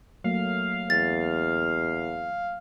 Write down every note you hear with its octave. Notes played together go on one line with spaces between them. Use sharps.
F#3 A3 A#3 F5
E2 A6